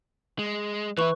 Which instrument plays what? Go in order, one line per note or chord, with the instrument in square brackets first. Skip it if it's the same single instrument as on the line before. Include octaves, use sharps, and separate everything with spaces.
[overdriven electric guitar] G#3
[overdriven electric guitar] E3 E4 [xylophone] B4 C#6